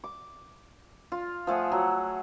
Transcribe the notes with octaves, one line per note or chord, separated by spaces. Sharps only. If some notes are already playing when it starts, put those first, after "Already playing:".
D6
F4
F3 A3 G#4 F#5
F#3